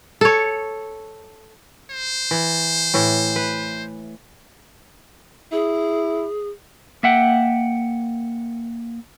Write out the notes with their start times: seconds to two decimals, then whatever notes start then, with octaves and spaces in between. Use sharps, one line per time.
0.21 A4 C#5
1.91 C5
2.31 E3
2.94 A2 E3
3.36 B4
5.52 E4 G#4
7.03 A#3 E5 F#5 G5